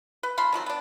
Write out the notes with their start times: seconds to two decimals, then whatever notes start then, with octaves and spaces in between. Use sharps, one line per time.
0.23 B4
0.38 D#3 F3 B5 C6
0.52 D#3 F3 F#3 C4
0.66 B3 D4